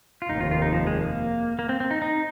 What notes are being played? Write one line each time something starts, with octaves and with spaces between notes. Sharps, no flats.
F4
F1 D#2 D#3 D#4
F4
F4
D#4
F3
G#3
A#3
A#3
C4
C4
D#4
D#4